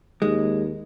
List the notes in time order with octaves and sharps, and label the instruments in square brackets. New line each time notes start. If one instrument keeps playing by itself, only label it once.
[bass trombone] D#2 [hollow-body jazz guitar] G#3